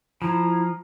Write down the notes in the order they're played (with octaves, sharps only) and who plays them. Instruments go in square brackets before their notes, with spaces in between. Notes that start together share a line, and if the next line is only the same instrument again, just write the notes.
[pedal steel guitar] F3 [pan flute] E4 [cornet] A#5